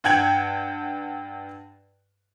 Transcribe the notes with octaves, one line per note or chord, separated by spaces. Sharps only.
G2 F#5 G5 G#6 F#7